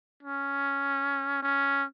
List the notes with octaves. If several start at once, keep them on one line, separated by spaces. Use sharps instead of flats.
C#4
C#4